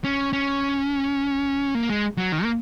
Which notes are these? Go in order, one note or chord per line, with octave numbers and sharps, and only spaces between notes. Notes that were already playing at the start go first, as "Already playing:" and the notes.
C#4
C#4
A#3
G#3
F#3
D#3
A#3